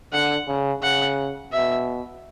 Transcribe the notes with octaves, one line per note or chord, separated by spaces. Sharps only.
D3 F#5
C#3
C#3 F#5
B2 E5